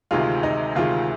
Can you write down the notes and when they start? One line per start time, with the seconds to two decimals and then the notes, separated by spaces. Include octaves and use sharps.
0.11 D2 C3 D#3 G#3 F4
0.43 D#4
0.75 D2 C3 D#3 G#3 F4